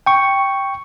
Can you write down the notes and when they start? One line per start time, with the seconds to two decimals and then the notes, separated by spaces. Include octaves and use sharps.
0.06 G5 C#6